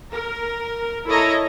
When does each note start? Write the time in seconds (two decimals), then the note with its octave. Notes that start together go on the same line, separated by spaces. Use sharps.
0.12 A#4
1.07 E4 A4 C#5 D#5 A#5